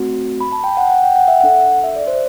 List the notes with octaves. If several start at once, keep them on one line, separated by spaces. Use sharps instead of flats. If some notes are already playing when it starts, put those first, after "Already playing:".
Already playing: A3 C4 F#4
B5
A5
G5
F#5
F#5
G5
F#5
E5
D4 A4 F#5
E5
D5
C5